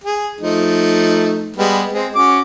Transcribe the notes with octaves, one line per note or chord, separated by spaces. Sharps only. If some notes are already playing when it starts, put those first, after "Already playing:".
G#4
F3 A3 D#4
G3 G#3 B3
G#3 C4
C#4 F#4 D6